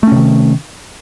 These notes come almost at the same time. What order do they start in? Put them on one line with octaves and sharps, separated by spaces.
A3 C#4 C3 D#3